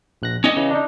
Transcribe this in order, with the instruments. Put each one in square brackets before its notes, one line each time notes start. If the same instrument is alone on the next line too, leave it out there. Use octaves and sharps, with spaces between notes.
[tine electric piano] A#1 F#6 A#6
[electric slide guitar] C#4 D#5 [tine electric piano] D#6
[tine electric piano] C#3 E3
D4 D#4